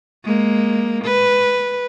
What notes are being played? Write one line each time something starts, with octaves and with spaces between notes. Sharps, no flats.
G#3 A#3
B4